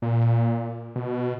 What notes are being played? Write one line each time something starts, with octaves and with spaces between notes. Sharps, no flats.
A#2
B2